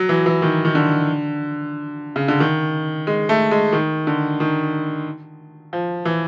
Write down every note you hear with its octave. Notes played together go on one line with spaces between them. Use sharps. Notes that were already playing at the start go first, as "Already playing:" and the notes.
Already playing: F#3
E3
E3
D#3
D#3
D3
C#3
D3
D#3
G#3
A3
G#3
D#3
D3
D#3
F3
E3